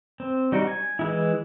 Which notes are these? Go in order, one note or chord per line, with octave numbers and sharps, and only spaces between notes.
C4
G3 D#4 F#4
G#5
E3 G#3 E4